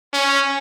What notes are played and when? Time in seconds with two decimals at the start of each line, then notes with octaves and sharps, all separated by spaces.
0.14 C#4